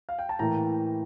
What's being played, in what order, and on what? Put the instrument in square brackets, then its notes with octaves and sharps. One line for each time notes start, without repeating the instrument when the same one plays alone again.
[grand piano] F5
G5
A5
A2 E3 A#3 G5 A#5